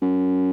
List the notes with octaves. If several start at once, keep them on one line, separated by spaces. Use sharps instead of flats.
F#2